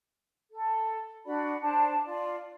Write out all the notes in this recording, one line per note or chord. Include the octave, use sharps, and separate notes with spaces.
A4
D4 F#4 D5 B5
D4 C5 A5
F4 D5